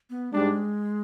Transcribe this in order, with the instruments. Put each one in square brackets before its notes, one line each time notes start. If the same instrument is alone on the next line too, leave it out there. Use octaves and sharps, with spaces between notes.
[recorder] B3
[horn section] G#2 G3 D4 [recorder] G#3